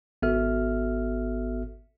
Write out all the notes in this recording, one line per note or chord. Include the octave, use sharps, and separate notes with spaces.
G#1 B3 F#4 A4 E5 F6